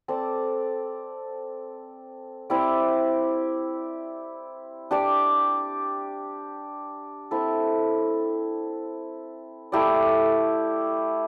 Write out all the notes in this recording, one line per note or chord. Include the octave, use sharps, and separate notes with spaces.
C4 A4 D5
C4 E4 G4 D5
D4 G4 D5
C4 E4 A4
A3 E4 G4 D5